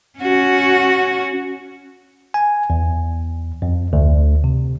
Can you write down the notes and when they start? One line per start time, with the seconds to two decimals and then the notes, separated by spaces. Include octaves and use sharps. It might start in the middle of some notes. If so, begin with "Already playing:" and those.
0.19 C#4 F#4
2.34 G#5
2.70 E2
3.62 F2
3.93 D2
4.44 C3